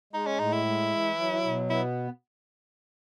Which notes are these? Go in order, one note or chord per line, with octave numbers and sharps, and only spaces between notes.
G#3 D#4
C#4
A2 D#4
E4
G#3
E3
F#3
B2
B3 E4